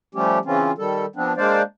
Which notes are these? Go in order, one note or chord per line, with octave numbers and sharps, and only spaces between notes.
F3 G3 A3 C#4 G4
C#3 E3 C4 C#4 F4
D#3 G3 A4
F3 B3 C4 D4
G#3 A#3 D4 C5 D5 F5